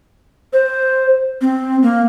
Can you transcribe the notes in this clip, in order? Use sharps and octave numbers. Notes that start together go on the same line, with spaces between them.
C5
C4
A#3